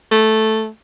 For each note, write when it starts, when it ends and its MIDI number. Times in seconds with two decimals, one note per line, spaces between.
0.11 0.68 57